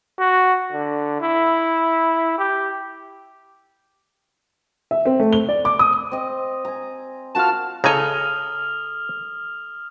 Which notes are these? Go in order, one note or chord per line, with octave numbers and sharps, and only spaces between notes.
F#4
D3
E4
G4
E5
C4
A3
G7
D5
D6
D#6
C4 D#5
G#5 A#5
F4 F#4 A#4 A5 F6
C#3 A4 G#5 A#5 D#6 F6 F7